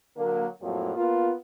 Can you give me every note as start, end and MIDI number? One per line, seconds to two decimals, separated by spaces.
0.17 0.46 50
0.17 0.46 54
0.17 0.46 58
0.62 0.96 41
0.62 0.96 45
0.62 0.96 53
0.62 0.96 54
0.62 0.96 58
0.96 1.32 58
0.96 1.32 59
0.96 1.32 65